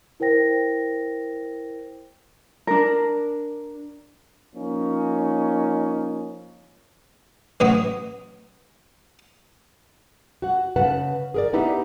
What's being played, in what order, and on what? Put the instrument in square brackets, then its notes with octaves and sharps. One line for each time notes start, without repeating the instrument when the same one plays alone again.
[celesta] E4 A#4 C5 G5 A#6
[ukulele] D4 A#4
[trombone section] F3 A#3 C#4 D#4
[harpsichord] A1 B2 F#3 E4 F#4 D#6
[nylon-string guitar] F#4 F#5
C#3 B4 F#5 A5
G#4 A#4 D5
B3 D#4 E4 G4 B4